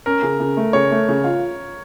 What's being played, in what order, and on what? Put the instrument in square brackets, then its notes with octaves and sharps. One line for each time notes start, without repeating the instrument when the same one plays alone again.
[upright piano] C#4 [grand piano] A#4
[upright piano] C#3
C#3
A3
[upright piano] C#3 [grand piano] C#5
[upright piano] A3
C#3
F4